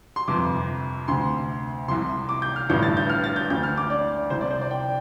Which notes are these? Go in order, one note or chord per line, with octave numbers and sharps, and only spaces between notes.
C6
G1 F2 C3 D6
D2 C3 C6
C2 C3 C6
D6
G6
F6
A1 G2 D3 G6
A6
G6
F6
A6
G6
D2 D3 G6
F6
D6
D5
C2 C3 C5
D5
C5
D5
G5